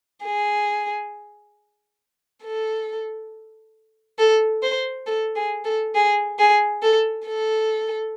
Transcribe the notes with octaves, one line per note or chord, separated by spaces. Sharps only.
G#4
A4
A4
C5
A4
G#4
A4
G#4
G#4
A4
A4